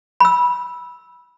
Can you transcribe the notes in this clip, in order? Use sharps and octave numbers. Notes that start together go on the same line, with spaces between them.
B5 E6